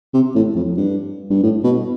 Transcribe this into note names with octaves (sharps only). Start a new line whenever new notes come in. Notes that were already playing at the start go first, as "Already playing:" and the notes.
C3
A2
F2
G2
G2
A2
B2